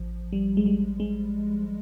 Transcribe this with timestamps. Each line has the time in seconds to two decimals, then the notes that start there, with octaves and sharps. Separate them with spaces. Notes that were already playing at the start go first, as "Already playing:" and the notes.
Already playing: A1 F3
0.33 G3
0.57 G#3
0.66 G3
1.00 G#3